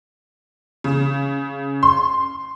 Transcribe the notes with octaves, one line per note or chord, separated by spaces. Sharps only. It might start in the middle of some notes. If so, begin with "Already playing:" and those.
C#3
C6